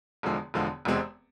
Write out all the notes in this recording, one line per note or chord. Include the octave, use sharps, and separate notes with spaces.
E1 E2 D3 F3 G#3
E1 E2 D3 F3 G#3
E1 E2 C3 G#3 C4